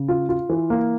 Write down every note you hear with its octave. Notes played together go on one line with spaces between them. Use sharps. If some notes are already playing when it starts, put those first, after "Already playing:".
Already playing: C#3
F4
F4
E3
A#3